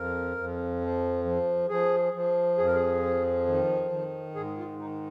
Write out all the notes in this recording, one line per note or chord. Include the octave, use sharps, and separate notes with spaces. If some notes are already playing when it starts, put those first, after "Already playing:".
Already playing: F2 A#4
F2
F3
F3
F3 G#4
F3
F2 G#4
A#4
G#4
F3
D#3
D#3
G#2 G#4
F4
D#3 D#4